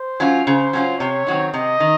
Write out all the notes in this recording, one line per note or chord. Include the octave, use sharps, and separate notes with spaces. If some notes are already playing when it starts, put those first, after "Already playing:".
Already playing: C5
F#3 C#4 F4
C#3 C5
F#3 C#4 F4
C3 C#5
D#3 F#3 C4
C3 D#5
D#3